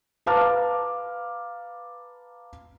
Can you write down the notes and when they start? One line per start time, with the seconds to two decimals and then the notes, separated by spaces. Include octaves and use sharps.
0.26 B4 F5 A5 A#5 D6 F6